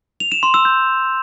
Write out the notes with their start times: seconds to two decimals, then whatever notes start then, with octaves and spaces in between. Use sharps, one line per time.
0.20 F7
0.32 E7
0.43 C6
0.54 E6
0.65 G6